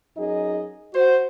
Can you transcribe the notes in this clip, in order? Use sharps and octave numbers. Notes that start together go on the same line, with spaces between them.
F#2 D#4 G#4 D#5
F#4 C5